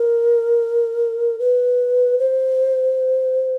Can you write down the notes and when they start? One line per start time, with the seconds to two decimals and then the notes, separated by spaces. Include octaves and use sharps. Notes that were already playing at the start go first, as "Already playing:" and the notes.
Already playing: A#4
1.39 B4
2.18 C5